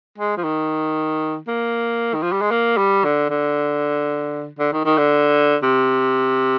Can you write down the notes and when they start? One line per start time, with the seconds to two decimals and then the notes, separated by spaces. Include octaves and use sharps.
0.18 G#3
0.37 F3
0.44 D#3
1.47 A#3
2.14 D#3
2.22 F3
2.32 G3
2.41 G#3
2.51 A#3
2.78 G3
3.04 D3
3.30 D3
4.59 D3
4.73 D#3
4.85 D#3
4.98 D3
5.63 C3